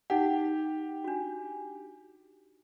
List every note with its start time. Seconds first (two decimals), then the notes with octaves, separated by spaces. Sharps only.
0.10 D#4 G4 F#5
1.04 D4 F#4